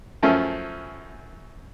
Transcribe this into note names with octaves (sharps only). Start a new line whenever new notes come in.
F#2 F3 A3 C#4